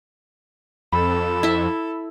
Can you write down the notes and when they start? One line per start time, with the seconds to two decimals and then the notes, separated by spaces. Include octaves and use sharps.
0.92 F2 A4 B5
1.43 E4 E5